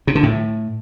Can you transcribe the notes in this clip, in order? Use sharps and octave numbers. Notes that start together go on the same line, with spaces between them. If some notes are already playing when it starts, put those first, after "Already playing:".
C3
D3
A2